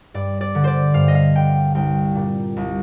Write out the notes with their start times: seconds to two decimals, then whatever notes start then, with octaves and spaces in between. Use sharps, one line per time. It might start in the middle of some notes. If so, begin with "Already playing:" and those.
0.14 G2 D5
0.41 D5
0.55 D3
0.64 C5 D5
0.94 G2 F5
1.08 D#5
1.15 F5
1.35 D3 G5
1.75 C2 G5
2.15 A#2
2.56 C2